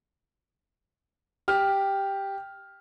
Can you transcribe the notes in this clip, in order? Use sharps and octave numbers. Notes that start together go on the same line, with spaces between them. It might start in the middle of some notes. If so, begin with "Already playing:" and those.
G4 F6